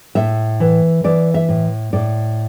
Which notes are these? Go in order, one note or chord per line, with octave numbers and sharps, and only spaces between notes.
A2 E5
E3
E3 D5
E5
A2
A2 D5